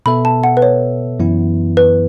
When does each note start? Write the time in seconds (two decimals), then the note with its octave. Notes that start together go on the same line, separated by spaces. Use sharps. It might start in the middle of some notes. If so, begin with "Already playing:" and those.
0.06 B2 B3 A4 E5 B5
0.25 A5
0.44 F#5
0.57 B4
0.62 C#5
1.19 F#2 E3 B3 E4
1.77 B4